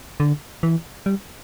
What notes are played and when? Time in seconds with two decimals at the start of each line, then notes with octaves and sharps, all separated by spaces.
0.20 D3
0.63 E3
1.06 G3